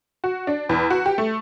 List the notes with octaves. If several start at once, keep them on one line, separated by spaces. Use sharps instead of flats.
F#4
D4
E2
F#4
G4
A3